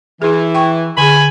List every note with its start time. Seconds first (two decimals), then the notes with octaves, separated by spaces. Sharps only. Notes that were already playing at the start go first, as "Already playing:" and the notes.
0.22 E3 E4 G#4
0.54 G5 C#6
0.98 D3 G#4 G#5 B5